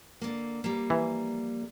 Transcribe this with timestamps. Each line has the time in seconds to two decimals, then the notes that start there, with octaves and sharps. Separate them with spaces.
0.21 D3 A#3
0.64 F3 G3 A#3
0.90 E3